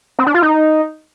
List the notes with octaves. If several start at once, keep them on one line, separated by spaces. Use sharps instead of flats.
C4
D4
F4
D#4